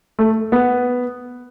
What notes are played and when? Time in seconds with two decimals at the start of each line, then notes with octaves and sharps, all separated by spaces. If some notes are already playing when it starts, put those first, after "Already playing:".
0.19 A3
0.52 B3